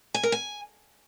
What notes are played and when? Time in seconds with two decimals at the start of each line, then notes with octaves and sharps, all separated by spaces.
0.14 G#5
0.23 A#4
0.32 G#5